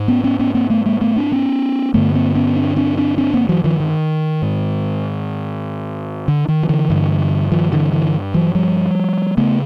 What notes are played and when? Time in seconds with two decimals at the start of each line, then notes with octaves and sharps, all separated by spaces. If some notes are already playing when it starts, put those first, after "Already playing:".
Already playing: G#2
0.08 B3 C#4
0.24 B3 C#4
0.39 B3 C#4
0.54 A#3 C4
0.70 A3 B3
0.86 G#3 A#3
1.01 A3 B3
1.16 C4 D4
1.32 B3 C#4
1.94 G2 D3 A3 B3
2.14 A#3 C4
2.35 B3 C#4
2.56 C4 D4
2.76 C4 D4
2.97 C4 D4
3.18 C4 D4
3.34 A#3 C4
3.49 E3 F#3
3.64 D#3 F3
3.80 D#3
4.42 G#2
6.28 D3
6.48 D#3
6.63 F3
6.69 D3 E3
6.90 G2 D3
7.52 D#3 F3
7.72 D3 E3
7.93 D3 E3
8.34 E3 F#3
8.55 F3 G3
9.37 C#3 A3 B3